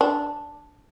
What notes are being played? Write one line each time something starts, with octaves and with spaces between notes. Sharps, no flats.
D4